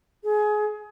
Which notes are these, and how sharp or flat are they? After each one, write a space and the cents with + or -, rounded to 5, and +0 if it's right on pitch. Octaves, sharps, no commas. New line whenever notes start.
G#4 +25